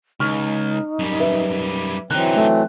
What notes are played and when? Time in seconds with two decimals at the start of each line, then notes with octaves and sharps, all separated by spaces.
0.20 C#2 D#4 C#6 F6
0.99 F#2 G3
1.19 B4 E5
2.11 D3 E3 F#3 C4 D#4 F#6
2.35 A3